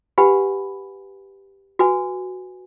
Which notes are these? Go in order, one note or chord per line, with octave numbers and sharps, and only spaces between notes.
G4 B4 F#5 G#5 B5
F#4 B4 G#5